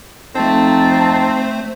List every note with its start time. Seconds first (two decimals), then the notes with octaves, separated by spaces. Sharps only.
0.35 F2 A3 C4 D#4 C5 A5